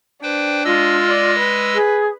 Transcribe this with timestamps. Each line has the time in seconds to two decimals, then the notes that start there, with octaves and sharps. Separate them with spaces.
0.23 D4 B4 C5 G5
0.65 G#3 F4 D#5 E6
1.08 D5
1.39 B4
1.74 G#4